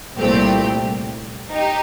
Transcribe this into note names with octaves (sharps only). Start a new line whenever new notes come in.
C2 A#2 A3 C4 G4
D#4 G4